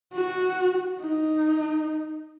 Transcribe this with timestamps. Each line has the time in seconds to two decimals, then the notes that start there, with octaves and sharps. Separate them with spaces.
0.14 F#4
1.00 D#4